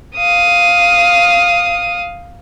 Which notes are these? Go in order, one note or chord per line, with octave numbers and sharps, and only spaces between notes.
F5 D#6